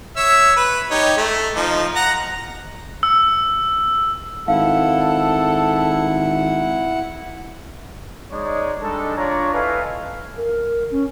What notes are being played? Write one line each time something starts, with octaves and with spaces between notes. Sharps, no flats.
C#5 E5 E6
B4
D#4 G4 C#5
A3
F3 D#4
F#5 A#5
E6
G#1 E4 A4 F5 F#5
G#3 D#4 C#5 D5
G3 G#3 D4 D#4 A4
D4 F4 C#5 D5 A#5 C#6
E4 A4 B4 D#5 F5 G#5
A#4
C#4